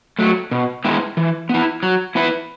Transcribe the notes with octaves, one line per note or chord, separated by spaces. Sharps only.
F#3 A3
B2
G#3 B3 E4
E3
B3 E4
F#3
B3 E4 B4